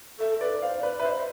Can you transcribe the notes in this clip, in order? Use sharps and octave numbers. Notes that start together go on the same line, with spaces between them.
A4 E5
B4 D5
C5 F5
D5
B4
B4 E5
C5
D5